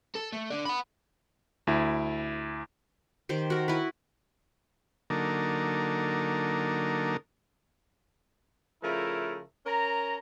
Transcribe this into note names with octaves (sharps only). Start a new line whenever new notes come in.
A4
A3
D3 D4
F#5 B5
D2 E4
D#3 G4 C5
F#4 A#4
E4 B4
D3 F#3 A#3 D#4 A4 A#4
C#3 F3 A3 E4 A#4
C#4 A#4 A#5